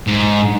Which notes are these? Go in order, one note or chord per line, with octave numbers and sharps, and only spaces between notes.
G#2